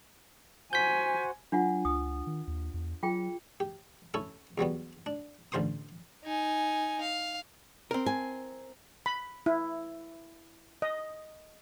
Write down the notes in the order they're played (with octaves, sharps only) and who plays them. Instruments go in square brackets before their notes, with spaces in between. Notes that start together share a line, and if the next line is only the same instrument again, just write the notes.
[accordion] F#4 C5 F#5 [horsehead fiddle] G#5 [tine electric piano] G6 B6
[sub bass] F#3 [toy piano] D4 F4 F#5
[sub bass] C#2 [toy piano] D#6
[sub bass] D#3
D#2
E2
[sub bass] F#3 [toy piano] F4 G#4 G5
[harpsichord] G4
C#4 E4 A4
E2 F#3 G3 B3
D4
A1 D3 F4 C5 C6 D#6
[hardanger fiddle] D#4 G#5
F5
[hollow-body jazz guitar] C4 A#4
[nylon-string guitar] G#5
[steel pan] B5
E4
D#5